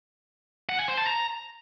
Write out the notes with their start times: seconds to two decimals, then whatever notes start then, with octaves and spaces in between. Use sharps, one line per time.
0.69 F#5
0.79 G#5
0.88 C5
0.97 A5
1.07 A#5